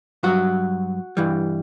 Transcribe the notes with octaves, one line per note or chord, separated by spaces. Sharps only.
G2 F#3 F#4
G2 E3 G3